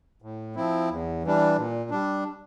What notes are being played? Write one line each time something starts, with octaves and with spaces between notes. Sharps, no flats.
A2
F3 C4 E4
E2
E3 G3 D4
A#2
G3 D4